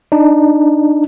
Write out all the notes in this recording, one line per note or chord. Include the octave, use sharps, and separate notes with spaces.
D4 D#4